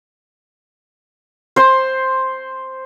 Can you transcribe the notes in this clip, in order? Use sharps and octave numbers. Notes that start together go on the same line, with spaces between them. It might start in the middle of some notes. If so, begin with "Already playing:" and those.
C5 C6